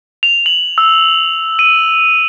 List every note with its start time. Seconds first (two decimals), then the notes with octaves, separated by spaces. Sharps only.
0.23 F7
0.46 F#7
0.78 E6
1.59 D#7